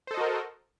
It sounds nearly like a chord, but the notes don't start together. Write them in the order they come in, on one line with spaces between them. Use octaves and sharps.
C5 A4 D#5 F#4 A#4